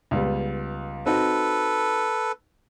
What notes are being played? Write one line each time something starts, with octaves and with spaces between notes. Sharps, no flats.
C#2 G3 B3
C4 D#4 F#4 A4 B4